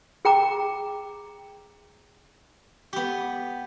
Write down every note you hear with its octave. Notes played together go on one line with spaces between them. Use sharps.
G#4 G5 A#5 D6
B3 G4